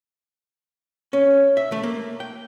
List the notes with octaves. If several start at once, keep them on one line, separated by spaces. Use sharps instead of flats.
C#4
E5
A3
A#3
G5